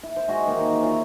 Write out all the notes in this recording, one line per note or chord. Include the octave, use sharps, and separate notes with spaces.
E4
C5
G#3 F#4 G#4
D#3 E3 A#3 D#4
G#5
E4 F4 C#5 A#5